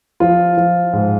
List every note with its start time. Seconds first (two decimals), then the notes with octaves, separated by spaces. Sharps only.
0.20 F3 F4
0.57 F3
0.93 G#2